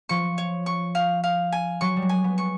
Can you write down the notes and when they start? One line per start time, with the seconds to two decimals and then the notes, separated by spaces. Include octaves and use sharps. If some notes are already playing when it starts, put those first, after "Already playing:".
0.09 F3 C#6
0.38 C#5
0.66 C#6
0.95 F5
1.24 F5
1.52 G#5
1.81 F#3 C#6
1.97 G3
2.02 G#3
2.09 G#5
2.24 B3
2.38 C#6